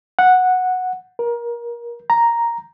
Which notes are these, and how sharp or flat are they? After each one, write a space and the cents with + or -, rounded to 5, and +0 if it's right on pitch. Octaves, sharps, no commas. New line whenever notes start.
F#5 -10
A#4 +25
A#5 +0